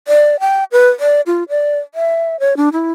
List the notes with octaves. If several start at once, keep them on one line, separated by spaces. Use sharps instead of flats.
D5
G5
B4
D5
F4
D5
E5
C#5
D4
E4